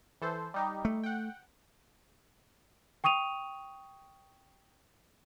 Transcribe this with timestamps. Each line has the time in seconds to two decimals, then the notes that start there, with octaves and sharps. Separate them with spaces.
0.22 E3 A4 C5
0.54 G3 D#4 G4
0.85 A3
1.04 F#5 G5
3.04 G5 C#6 D#6 D#7 F7